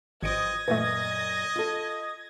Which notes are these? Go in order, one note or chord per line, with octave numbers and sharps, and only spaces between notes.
G#1 G2 F3 D#5 G#6 A#6 C#7 D7
F#2 A#2 E3 A3 D#5
F4 A4